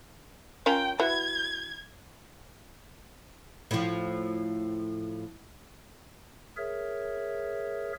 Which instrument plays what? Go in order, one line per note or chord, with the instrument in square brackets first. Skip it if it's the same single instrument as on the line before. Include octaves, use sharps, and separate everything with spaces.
[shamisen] C#4 F4 A#4 [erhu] G5
[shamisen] E4 F#4 B4 [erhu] G#6
[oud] A2 F3
[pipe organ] G#4 A#4 C#5 E5